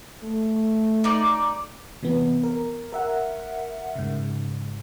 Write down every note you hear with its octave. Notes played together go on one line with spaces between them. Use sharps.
A3
D#4 D5
C3 E3 B3
A#4
A#4 E5 F#5
G#2 C#3